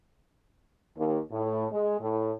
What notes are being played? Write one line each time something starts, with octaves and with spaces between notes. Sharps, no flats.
D#2
A2
G#3
A2